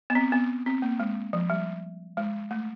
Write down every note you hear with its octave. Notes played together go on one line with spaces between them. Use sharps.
B3
C4
B3
C4
A#3
G#3
F3
G3
G#3
A3